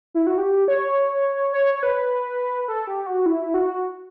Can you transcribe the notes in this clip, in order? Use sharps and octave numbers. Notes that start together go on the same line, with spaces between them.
E4
F#4
G4
C#5
C#5
C#5
B4
A4
G4
F#4
E4
F#4